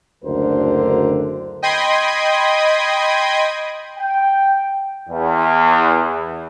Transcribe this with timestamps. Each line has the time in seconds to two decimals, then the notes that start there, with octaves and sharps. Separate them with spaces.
0.23 F#1 D2 D3 A#4 C5
1.62 D#5 G5 B5 C6 D#6 G#6
3.99 G5
5.08 E2